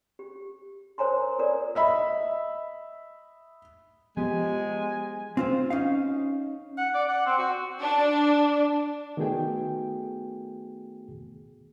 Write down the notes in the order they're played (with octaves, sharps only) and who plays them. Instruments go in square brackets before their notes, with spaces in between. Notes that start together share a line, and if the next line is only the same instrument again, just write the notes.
[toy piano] G4
A#4 C5 C#5 G#5 A#5 C6
F4 A4 A#4 C#5 D5
[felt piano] D#5 E5 B5
[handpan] F3 [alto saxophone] G#3 [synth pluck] B3 G4 [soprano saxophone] G#5
[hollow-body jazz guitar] C4 F4 C5
C#4 D#4 F5
[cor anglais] F#5
D5
F#5
C4
F#4
[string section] D4
[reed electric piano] D#3 A3 B3 F#4 G#4 G5